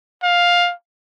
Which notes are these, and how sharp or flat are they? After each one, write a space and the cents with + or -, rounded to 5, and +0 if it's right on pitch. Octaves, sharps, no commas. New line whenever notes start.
F5 +10